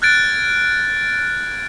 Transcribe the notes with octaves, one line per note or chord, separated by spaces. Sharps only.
F6 F#6 G#6 A6 D7